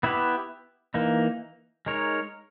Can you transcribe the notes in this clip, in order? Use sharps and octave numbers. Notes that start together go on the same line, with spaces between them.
B3 E4 G4 B4
E3 A#3 D#4
G#3 D#4 A#4 C#5